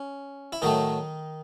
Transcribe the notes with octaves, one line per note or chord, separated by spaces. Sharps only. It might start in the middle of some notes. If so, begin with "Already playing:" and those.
Already playing: C#4
E4
A2 D#3 F#3 A3 D#4